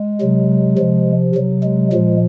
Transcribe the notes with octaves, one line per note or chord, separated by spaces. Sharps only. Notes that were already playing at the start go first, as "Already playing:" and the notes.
Already playing: G#3
C3 F#3
C3 F3
C3 F#3
G#3
A#2 F3 G#3